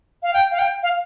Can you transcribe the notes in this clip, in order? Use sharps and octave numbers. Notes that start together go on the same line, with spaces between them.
F5
G5
F5
G5
F5